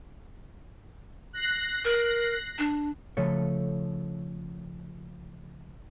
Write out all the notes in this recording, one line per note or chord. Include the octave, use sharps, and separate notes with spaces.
F#6 A#6 C7
A#4
D4
C#3 F3 A3 A4 C#5